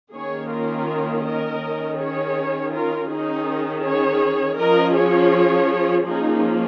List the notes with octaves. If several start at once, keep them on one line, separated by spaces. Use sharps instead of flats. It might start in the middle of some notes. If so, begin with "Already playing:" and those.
D#3 A#3 C#4 G#4 C#5
F4 A#4
A#4 D#5
D#3 C#4
G#4 C#5
F4 A#4
D#3 C#4 D#4 G#4
G#4 C#5
F3 C#4 A#4 D#5
G#4 C#5
F3 A#3 C#4 D#4 G#4